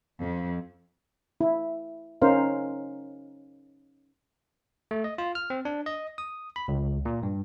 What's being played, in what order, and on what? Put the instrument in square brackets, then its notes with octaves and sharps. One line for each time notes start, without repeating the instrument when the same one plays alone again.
[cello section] F2
[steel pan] E4
C#4 D#4 A#4 C5 F5
[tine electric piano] A3
D#5
F4
F6
C4
D4
D#5
D#6
B5
C#2
A#2
G2